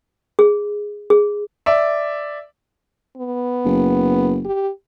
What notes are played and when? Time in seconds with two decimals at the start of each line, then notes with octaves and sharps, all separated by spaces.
0.39 G#4
1.10 G#4
1.66 D5 E5
3.17 B3
3.66 F#1
4.45 G4